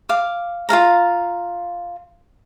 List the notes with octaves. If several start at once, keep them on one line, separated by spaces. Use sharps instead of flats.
F5 D6
F4 A4 F5 A#5